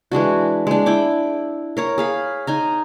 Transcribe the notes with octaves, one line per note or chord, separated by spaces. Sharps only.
E3 G#3 D4 F#4
G#3 D4
E4 G5 D6
A#4 C#5 A#5
G#4 F5 B5
D#4 G#5 A#5